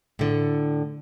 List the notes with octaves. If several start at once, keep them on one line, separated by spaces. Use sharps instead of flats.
A2 D3